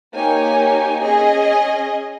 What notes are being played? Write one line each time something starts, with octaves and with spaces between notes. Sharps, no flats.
A#3 D#4 G4 C#5 G#5
C#4 G#4 D#5 G#5